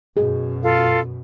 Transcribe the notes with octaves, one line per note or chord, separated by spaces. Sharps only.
F#2 B2 G#4
F4 A4 F5